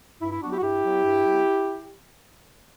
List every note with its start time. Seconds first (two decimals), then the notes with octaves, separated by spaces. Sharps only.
0.20 G2 E4
0.31 E4
0.41 F#3 B3 D4 F#4
0.51 E4 G4
0.58 F#4
0.62 G2 E4 G4
0.83 F#3 B3
1.03 G2
1.24 F#3 B3